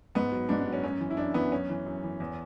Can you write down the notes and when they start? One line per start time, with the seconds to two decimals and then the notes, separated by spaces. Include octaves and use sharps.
0.15 G#2 B3
0.32 F#3
0.49 G#2 D4
0.61 D4
0.66 F#3
0.73 C#4
0.83 F#2 C#4
1.00 E3
1.10 E4
1.17 F#2 D4
1.34 E3 B3
1.51 F#2 C#4
1.69 E3
1.86 F#2
2.03 E3
2.20 E2